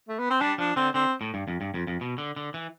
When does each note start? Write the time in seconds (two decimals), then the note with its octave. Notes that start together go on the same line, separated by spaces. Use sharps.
0.08 A3
0.19 B3
0.30 C4
0.41 G3 D4
0.58 F3 D4
0.76 D3 C4
0.94 D3 C4
1.21 A2
1.34 G2
1.48 F2
1.61 G2
1.74 F2
1.87 F2
2.01 B2
2.18 D3
2.36 D3
2.54 E3